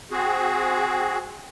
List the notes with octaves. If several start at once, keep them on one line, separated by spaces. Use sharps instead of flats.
C4 F#4 G#4